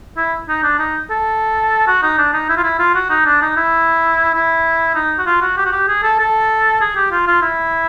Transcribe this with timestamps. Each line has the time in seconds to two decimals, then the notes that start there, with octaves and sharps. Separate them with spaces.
0.17 E4
0.49 D#4
0.64 D4
0.79 D#4
1.10 A4
1.87 F#4
2.03 D#4
2.18 D4
2.33 D#4
2.49 E4
2.57 F4
2.64 E4
2.79 F4
2.95 F#4
3.10 D#4
3.26 D4
3.42 D#4
3.57 E4
4.34 E4
4.95 D#4
5.18 F#4
5.26 F4
5.41 F#4
5.57 G4
5.65 F#4
5.72 G4
5.88 G#4
6.03 A4
6.19 A4
6.81 G#4
6.96 G4
7.11 F4
7.27 F4
7.42 E4